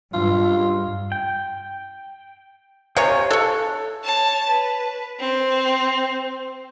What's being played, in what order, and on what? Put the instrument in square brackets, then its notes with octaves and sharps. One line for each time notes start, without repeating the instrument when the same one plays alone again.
[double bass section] G2 [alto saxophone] F4
[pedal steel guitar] G5
[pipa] C3 C#5 C#6 [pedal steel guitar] C5 F5 G#5
[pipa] A4 C#5 [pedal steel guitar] F#6
[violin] C#5 A5
B4
C4